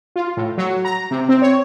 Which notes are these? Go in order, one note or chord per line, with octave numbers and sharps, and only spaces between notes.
F4
A2
F#3
A#5
C3
C4
C#5